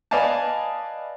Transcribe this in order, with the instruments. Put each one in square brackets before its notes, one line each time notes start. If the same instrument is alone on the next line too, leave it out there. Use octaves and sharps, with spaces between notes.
[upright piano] B4 D5 D#5 F5 G#5 A5